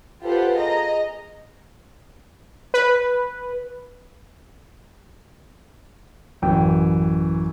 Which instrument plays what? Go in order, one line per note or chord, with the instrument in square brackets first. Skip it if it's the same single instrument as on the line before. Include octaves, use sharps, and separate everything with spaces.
[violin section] F4 G4 A4 B4 C5 F#5
G#4 D#5 A#5 A#6
[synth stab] B4
[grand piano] A1 E3 [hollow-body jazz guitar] F#2 G5